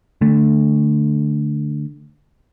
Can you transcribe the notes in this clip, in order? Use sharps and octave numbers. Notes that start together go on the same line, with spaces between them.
D3 A3